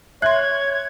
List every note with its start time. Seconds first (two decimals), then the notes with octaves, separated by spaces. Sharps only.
0.22 C#5 E5 C6 F#6 G#6